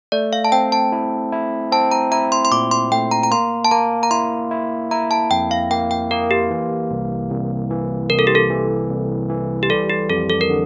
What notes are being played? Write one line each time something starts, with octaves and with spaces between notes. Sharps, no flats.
A3 D5
F5
A5
C4 G5
A5
E4
E4
C4 A5
A#5
E4 A#5
C6
C6
A#2 D6
C6
A3 G5
A#5
A#5
A#3 C6
A5
A#3 A#5
A#5
E4 C6
E4
E4 A#5
A5
F2 G5
F5
A#3 G5
G5
A#3 A#4
G4
E3
C2
C2
E3
C2 A#4
A4
G4
A4
E3
C2
E3
G4
G3 A4
G4
F2 A4
A4
A#4
D3